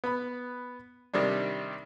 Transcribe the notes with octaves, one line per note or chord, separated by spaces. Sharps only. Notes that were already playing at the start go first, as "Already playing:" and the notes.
B3 B5
C3 D#3 G3 C4 D4